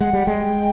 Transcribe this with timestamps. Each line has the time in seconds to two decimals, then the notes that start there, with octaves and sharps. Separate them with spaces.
0.01 G#3 F#5
0.13 G3
0.26 G#3 G5